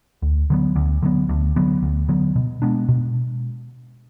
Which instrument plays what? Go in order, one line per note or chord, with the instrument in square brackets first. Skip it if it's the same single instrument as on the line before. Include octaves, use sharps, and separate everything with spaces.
[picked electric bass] D2
D3 F#3 B3
D2
D3 F#3 B3
D2
D3 F#3 B3
D2
D3 F#3 B3
B2
G#3 B3 D4
B2